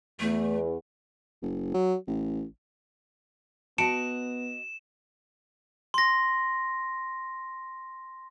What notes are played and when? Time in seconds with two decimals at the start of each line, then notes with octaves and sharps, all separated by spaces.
0.20 E2 A3
1.42 F#1
1.74 F#3
2.08 A1
3.78 B3 F#4 D#5 A5 C#7 D7 E7
5.94 C6 A#6